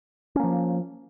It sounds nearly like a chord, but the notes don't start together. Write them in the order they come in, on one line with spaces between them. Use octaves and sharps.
C#4 A#3 F3